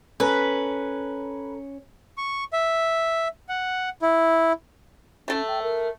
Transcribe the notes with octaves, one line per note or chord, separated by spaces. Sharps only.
C#4 A4 B4 A#5
C#6
E5
F#5
E4
A3 C#4 A4
G5
A#4